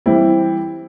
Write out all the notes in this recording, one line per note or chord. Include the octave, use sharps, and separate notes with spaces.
E3 G3 C4 E4